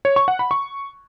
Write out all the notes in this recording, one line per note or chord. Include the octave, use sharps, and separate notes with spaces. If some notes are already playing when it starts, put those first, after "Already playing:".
C#5
C#6
F#5
B5
C#6